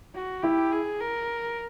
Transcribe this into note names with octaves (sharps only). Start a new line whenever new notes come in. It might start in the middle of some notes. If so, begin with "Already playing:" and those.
F#4
E4 G4
G#4
A#4